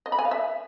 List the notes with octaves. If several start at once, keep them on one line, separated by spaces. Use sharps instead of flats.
D#5
B5
G#5
F5
E5